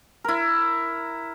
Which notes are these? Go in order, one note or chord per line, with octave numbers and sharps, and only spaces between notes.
E4 A#4